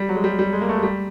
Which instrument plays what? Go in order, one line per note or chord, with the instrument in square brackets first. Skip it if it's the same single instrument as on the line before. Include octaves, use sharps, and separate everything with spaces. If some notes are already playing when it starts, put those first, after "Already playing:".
Already playing: [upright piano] G3
F#3
G#3
G3
G3
G#3
A#3
A3
G#3
G3